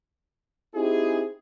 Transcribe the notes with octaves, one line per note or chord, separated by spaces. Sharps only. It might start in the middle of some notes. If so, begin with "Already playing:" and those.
C4 D#4 E4 G4 G#4